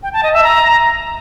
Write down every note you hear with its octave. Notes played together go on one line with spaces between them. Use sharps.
G5
A5
D#5
E5
A#5